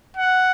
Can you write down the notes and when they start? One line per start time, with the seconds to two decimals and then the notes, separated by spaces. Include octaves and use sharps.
0.17 F#5